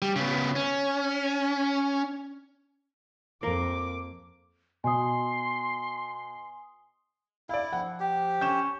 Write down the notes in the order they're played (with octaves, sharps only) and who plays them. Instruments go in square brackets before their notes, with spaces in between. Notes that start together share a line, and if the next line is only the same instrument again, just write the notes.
[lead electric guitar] G3
C#3 B3
C#4
[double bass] F2 [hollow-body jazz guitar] A#3 A#4 [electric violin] D6
[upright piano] B2 [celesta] G#5 D#6 [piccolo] C6
[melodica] E4 [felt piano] D5 F5
[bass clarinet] F3 [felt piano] F#5
[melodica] G4
[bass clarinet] C#4 [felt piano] G6 E7